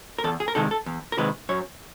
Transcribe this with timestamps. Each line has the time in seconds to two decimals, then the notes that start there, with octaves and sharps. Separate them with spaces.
0.19 A#4
0.24 E2 A4
0.40 G#4
0.48 A#4
0.55 C3 D#3 G#3 A4
0.71 A4
0.86 E2
1.12 A#4
1.18 C3 D#3 G#3 B4
1.49 F#2 C#5